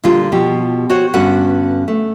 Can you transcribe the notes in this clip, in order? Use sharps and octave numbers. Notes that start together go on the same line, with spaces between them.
A#2 D3 G3 D4 F4
B2 F3 G4
F#4 C5 C#5 F#5
G2 D3 B3 C#4 F#4 F#5
A3